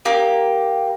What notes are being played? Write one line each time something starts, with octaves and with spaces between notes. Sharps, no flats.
A#3 G4